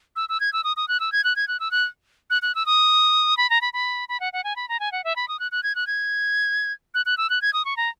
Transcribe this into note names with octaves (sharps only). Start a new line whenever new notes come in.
E6
E6
G#6
E6
D#6
D#6
F#6
E6
G#6
F#6
G#6
F#6
E6
F#6
F#6
F#6
E6
D#6
B5
A#5
B5
B5
B5
F#5
F#5
G#5
B5
A#5
G#5
F#5
E5
B5
D#6
F#6
F#6
G#6
F#6
G#6
F#6
F#6
E6
F#6
G#6
D#6
C#6
A#5